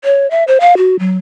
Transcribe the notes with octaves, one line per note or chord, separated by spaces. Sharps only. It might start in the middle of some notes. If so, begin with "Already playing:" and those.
C#5
E5
C5
F5
F#4
F#3